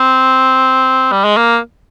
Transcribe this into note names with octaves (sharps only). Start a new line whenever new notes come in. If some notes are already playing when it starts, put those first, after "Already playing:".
Already playing: C4
G3
G#3
A#3